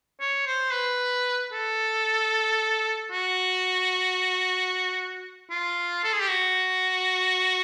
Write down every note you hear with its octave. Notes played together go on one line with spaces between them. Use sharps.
C#5
C5
B4
A4
F#4
F4
A4
G#4
G4
F#4